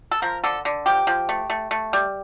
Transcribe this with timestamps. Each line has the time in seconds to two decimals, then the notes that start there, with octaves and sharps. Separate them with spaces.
0.11 A4
0.22 F3 A#4
0.44 D3 A4
0.65 D3
0.86 F3 G4
1.07 F3
1.29 A3
1.50 A3
1.71 A3
1.93 G3